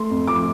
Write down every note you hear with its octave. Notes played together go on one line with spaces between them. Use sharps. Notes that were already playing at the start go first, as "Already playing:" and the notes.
Already playing: A3 C6
F2
F3 D6